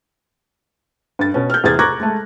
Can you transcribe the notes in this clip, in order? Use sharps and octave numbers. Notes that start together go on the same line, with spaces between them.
G2 A6
B2 C#4
F6 G6
E2 C3 G#4 G#6 A6
A#5 C#6 D6 F#6 G#6 A#6
G#3 A3